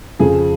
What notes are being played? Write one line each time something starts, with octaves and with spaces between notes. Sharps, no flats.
F2 C#3 F3 G#4